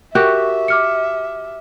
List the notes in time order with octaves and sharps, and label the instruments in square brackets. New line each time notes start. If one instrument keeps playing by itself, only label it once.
[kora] F#4 G4 [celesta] A#4 C#6 F#6 [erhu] E5
[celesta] D6 F6 C#7